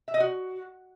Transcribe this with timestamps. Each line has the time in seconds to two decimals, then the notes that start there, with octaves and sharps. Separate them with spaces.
0.08 E5
0.14 D#5
0.20 F#4